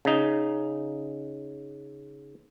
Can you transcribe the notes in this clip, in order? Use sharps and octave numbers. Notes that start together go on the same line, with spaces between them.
C#3 D#4